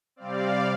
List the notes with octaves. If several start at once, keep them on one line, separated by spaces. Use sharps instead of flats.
C3 G3 C4 D5 F5